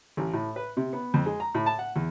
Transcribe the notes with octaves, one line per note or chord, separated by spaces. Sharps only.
A1
A2
B4
C3
B3
F2
G#3
A#5
A2
A5
F#5
E2